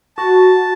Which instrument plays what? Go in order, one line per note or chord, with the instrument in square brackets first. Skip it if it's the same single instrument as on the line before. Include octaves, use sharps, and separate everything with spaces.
[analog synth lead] F#4 [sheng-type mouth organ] A5